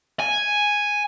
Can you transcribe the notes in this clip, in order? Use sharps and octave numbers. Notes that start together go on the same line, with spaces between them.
G#5